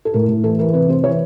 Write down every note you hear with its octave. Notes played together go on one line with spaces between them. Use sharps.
A4
A2 A#4
A2
E3 A4
E3 A#4
C3 B4
C3 C5
E3 C#5